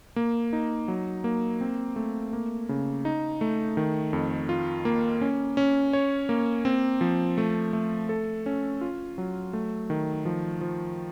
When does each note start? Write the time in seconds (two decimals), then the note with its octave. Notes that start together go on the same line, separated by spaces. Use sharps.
0.16 A#3
0.53 D#4
0.88 F#3
1.24 A#3
1.61 C4
1.96 A3
2.33 A#3
2.69 C#3
3.05 D#4
3.41 A3
3.77 D#3
4.13 F2
4.49 F4
4.85 A#3
5.21 C#4
5.57 C#4
5.93 C#5
6.29 A#3
6.65 C4
7.01 F3
7.38 A3
7.73 A3
8.09 A4
8.46 C#4
8.81 F4
9.18 F#3
9.53 A3
9.90 D#3
10.25 F3
10.61 F3